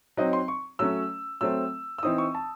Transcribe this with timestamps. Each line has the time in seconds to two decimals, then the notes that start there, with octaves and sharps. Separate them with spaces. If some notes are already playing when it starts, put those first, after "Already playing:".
0.17 F#3 C4 D#4 D#5
0.33 C6
0.48 C#6
0.79 F#3 A3 C#4 E6
1.41 F#3 A3 C4 E6
1.98 E6
2.03 E3 C4 D#4 D#6
2.18 C#6
2.35 A5